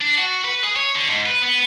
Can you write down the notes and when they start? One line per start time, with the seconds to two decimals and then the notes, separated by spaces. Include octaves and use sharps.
0.01 D4
0.18 F#4
0.44 B4
0.64 G#4
0.76 C#5
0.95 D3
1.09 G#2
1.26 B4
1.42 B3